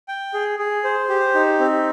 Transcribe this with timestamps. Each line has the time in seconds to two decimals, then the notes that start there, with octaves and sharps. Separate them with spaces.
0.08 G5
0.34 G#4
0.59 G#4
0.84 C5
1.09 G4
1.35 D#4
1.60 C4